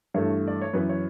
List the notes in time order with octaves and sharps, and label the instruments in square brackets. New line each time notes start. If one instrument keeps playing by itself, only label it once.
[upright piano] G2 E3 A3 C#5
D5
C#5
F#2 E3 B3 B4
C#5